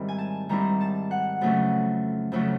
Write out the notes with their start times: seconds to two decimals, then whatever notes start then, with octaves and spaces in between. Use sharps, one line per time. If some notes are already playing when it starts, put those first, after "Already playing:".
Already playing: G#2 D#3 G3 C4 E4
0.09 G#5
0.18 A5
0.49 G#2 D#3 G3 C4 E4 A#5
0.81 A5
1.11 F#5
1.41 F2 C#3 F#3 A3 C#4
2.32 F2 C#3 F#3 A3 C#4